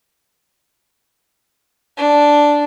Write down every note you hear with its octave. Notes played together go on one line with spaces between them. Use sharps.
D4